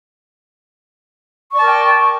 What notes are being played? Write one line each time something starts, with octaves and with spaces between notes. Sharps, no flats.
A#4 D5 G5 A5 C#6